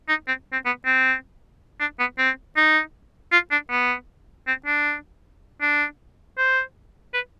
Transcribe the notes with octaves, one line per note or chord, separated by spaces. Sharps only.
D#4
C4
C4
B3
C4
D4
B3
C4
D#4
F4
D4
B3
C4
D4
D4
C5
B4